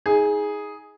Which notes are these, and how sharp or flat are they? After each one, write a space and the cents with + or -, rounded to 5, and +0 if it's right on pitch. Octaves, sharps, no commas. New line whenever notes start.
D#4 +30 G#4 +0